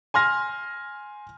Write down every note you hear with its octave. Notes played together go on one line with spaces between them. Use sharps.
G#5 C6 F6 A#6